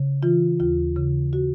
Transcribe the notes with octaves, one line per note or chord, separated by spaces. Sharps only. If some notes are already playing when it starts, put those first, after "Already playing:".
Already playing: C#3
E3 F4
D#2 F4
C#3
F#4